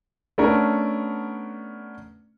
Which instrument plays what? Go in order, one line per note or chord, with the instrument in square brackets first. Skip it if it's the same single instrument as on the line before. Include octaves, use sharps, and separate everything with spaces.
[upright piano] A3 B3 C#4 D4 A#4